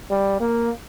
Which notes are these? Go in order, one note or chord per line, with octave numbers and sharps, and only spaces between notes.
G3
A#3